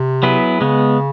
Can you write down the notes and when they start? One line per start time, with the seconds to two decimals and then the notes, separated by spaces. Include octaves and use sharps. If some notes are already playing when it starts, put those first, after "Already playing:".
Already playing: C3
0.23 F#3 B3 E4 G#4 B4
0.61 C#3 G#3 B3